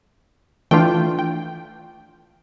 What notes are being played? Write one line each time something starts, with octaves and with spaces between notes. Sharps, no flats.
E3 A3 D4 F4 G5
G5